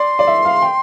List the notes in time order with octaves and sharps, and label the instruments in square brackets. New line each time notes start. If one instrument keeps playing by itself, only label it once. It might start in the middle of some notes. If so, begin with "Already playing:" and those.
Already playing: [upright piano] D5 [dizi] C6
[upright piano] D5
E5
F5
G5